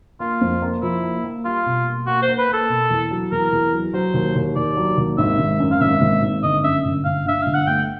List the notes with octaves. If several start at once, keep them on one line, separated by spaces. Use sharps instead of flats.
A#3 F4
F2
A#3
F3 E4
A#3
A#3
G3 F4
B2
A#3
A#3 F#4
C5
A#3
B4
A#3 A4
B2
E2
F#3
E2 A#4
E2
F#3
F#3 C5
D#2
D#2
D#2 D5
F#3
D#2
G#1 E5
G#1
F#2
F5
G#1 E5
G#1
G#1
G1 D#5
F#2 E5
G1
G1 F5
D3 E5
G1 F5
F#5
A3 G5